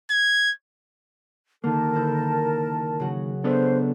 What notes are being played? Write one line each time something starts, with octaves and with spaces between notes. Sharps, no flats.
G#6
D3 D#3 A#3 A#4 A5
F#1 E4 G6
C#3 F#3 F#4
B3 D4 A4 C5